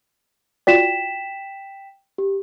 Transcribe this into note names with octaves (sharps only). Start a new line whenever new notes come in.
F4 F#4 D5 G5 B6 E7
G4